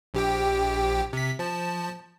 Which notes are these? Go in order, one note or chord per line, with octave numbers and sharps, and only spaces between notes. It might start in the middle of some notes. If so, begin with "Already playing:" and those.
A#1 G4 G5
C3 B6
F3 A5